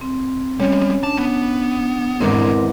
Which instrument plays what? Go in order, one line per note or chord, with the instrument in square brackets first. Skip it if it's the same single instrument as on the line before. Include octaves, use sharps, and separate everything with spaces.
[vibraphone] C4
[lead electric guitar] G3 G#3 [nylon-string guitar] C#4
[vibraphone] D4 [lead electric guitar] A5
[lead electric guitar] B3
[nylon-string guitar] E2 G#2 B3 [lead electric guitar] D#3 D4 [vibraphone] C4 A#4 D6